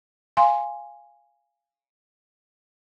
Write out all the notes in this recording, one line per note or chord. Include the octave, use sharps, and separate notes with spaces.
F5 G#5 C6